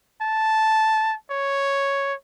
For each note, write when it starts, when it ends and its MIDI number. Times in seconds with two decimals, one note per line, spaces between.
0.22 1.15 81
1.30 2.13 73